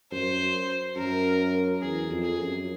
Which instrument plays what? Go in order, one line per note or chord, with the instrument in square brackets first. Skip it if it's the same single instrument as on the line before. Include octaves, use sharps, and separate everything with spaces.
[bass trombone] F#2 [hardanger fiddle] C5
[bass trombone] F#2 [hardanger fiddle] A#4
[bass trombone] E2 [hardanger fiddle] G#4
[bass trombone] F2
[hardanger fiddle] G#4
[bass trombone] F#2